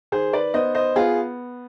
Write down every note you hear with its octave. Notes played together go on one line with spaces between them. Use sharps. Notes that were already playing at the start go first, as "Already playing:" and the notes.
D#3 G#4 C5
B4 D5
B3 C5 D#5
C5 D#5
B3 F4 G#4